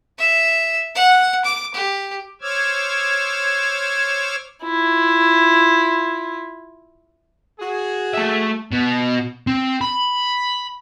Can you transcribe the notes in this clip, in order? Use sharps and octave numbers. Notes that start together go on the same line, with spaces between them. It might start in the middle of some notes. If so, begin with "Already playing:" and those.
E5
F#5
D6
G4
C5 C#5 D6 E6 F6 G#6
E4 F4
F#4 G#4
A3 E5
B2
C4
B5